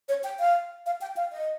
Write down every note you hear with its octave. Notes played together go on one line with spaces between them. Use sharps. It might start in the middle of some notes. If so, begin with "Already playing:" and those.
C#5
G5
F5
F5
G5
F5
D#5